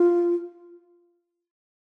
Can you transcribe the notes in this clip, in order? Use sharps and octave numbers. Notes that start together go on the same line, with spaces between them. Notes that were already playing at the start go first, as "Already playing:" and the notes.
Already playing: F4